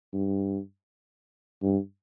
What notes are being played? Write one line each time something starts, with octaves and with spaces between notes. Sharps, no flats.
G2
G2